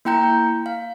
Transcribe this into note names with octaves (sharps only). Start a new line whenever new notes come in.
A#3 E4 G5 A#5 G6
F5